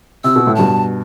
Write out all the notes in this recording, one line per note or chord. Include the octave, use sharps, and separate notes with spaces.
C3 E6
B2
A2
G2 B2 A5